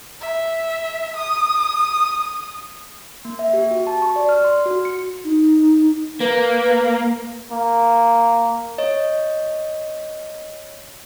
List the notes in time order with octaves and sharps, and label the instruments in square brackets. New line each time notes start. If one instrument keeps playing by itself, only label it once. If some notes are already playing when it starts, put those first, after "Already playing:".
[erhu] E5
D#6
[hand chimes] A#3
E5
G4
F#4
A5
C#6
D5
F6
C6
F#4
C#7
[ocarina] D#4
[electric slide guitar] A#3 [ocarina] B4
[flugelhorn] A#3
[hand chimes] C#5 D#5